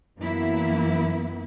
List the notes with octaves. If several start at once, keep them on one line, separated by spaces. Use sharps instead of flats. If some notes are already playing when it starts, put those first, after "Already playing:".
F#2 E3 A#3 B3 E4